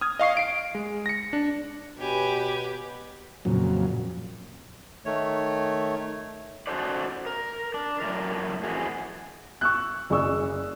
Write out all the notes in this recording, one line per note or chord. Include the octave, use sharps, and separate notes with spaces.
D#6 F6 G#6
D#5 F5 C#6 C7
C7 D7
G#3
A#6 C#7
D4
B2 G4 B4 C#5 G#5
F2 A#2 C#3 F#3
D#3 A3 C#5
C#4 D#4 F#4 A4 C5 D5
A#4
D4
F#2 A2 D#3 A#4
F2 C3 E3 F#4 G#4
C#6 E6 F#6
F#1 G#4 D5 C#6 E6